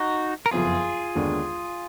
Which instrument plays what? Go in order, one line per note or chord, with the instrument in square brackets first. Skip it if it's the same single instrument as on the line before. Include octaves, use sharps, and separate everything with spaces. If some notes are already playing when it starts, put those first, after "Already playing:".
Already playing: [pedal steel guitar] D#4 F#4
A#4
[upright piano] F#1 F2 F3 B3 [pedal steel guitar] F4 G#4
[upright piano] D#2 D3 G#3 B3 D4